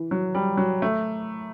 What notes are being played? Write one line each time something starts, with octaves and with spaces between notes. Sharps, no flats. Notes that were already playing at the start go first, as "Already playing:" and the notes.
Already playing: E3
F#3
G3
F#3
A3